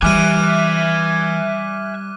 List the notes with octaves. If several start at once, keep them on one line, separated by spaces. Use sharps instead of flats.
E3 G3 E5 G#5 D6 F6 F#6 D#7